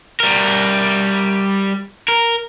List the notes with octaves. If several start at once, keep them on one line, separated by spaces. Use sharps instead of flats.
G3 A#4
A#4